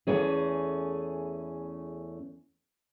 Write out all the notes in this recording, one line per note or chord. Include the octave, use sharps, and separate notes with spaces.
E2 G2 E3 A3 C#4 G#4